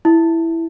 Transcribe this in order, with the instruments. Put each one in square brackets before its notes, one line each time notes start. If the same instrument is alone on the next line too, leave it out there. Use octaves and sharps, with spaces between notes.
[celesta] E4